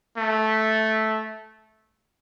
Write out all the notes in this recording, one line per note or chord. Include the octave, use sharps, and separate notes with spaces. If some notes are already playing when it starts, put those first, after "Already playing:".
A3